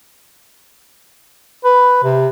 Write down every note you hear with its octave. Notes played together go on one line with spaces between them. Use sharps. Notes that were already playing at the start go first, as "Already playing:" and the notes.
B4
C3